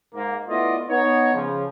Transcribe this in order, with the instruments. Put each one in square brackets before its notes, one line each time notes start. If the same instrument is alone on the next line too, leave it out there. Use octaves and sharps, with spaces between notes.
[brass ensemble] G#2 A#3
A3 B3 E4 F4 D5 D#5
B3 D#4 C#5
C#3 F3